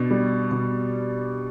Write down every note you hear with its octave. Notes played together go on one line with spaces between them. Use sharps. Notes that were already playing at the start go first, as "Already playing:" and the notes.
Already playing: B2 D4
G3
B2